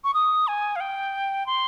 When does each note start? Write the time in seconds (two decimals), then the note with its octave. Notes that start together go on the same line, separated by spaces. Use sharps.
0.04 C#6
0.14 D#6
0.47 G#5
0.76 F5
0.80 G5
1.46 C6